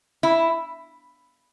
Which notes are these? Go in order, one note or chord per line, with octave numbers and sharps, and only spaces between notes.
E4